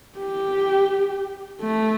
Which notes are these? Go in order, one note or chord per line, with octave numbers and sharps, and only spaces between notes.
G4
A3